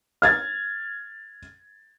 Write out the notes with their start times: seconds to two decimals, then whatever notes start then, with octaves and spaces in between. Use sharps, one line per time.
0.22 F6 G#6 A6